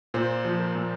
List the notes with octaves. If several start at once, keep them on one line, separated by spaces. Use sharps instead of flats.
A#2 C5
F3
A#4
A#2